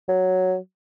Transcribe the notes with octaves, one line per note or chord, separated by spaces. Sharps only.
F#3